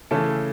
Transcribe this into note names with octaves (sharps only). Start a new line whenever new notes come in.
C#3 E3 A3 A4